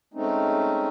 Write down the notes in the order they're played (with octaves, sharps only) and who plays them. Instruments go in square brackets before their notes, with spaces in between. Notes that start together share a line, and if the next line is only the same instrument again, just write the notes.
[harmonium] G#3 A3 C4 C#4 D#4